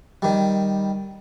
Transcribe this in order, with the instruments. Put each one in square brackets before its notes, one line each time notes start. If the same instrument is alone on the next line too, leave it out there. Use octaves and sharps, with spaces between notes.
[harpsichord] D#3 G3